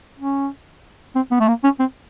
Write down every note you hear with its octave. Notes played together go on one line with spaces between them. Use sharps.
C#4
C4
B3
A3
A#3
C#4
C4